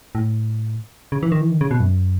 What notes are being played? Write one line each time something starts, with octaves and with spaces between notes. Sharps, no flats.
A2
C#3
E3
D#3
E3
D#3
C#3
B2
F#2